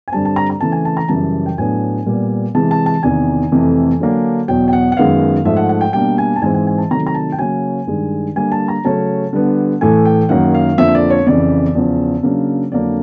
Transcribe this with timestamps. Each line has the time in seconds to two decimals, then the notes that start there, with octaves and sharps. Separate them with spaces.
0.08 G#5
0.12 G2 D3 G3 C4 A5
0.25 A5
0.36 A#5
0.50 A#5
0.60 C#3 E3 A3 C4 A5
0.72 G#5
0.85 A5
0.97 A#5
1.09 F#2 C#3 E3 G3 A5
1.46 G5
1.58 A2 F#3 B3 D4 G#5
2.06 A#2 G3 B3
2.55 C3 E3 G#3 A5
2.71 A5
2.86 A5
3.03 E2 C3 D#3 G#5
3.52 F2 C3 E3 A3
4.00 D3 F#3 A#3 D4
4.48 E2 B2 F#3 G5
4.68 G5
4.73 F#5
4.92 F#5
4.97 F#2 D#3 G#3 B3 F5
5.45 G#2 F3 A3 E5
5.57 F#5
5.69 F#5
5.81 G5
5.93 B2 G3 A#3 D4 G5
6.18 G#5
6.36 A5
6.42 G#2 E3 G#3 C4 G#5
6.54 G#5
6.67 G#5
6.78 A5
6.91 C3 D#3 F#3 A3 A#5
7.07 A#5
7.15 A5
7.32 G5
7.39 C#3 F#3 A#3 C#4 G#5
7.87 G2 D#3 G#3
8.36 D3 G3 A#3 G#5
8.52 A5
8.68 A#5
8.84 C#3 F#3 A3 C#4 A5
9.33 D3 G3 B3
9.81 A2 E3 A3 G#5
10.05 G5
10.29 F#2 D#3 F#3 A#3 F#5
10.54 F5
10.78 F2 D3 F3 A#3 E5
10.95 D5
11.10 C#5
11.27 F2 C#3 E3 D5
11.75 E2 C#3 F3
12.23 C#3 F#3 A#3 D4
12.72 F2 D3 F#3 A#3 D4 D5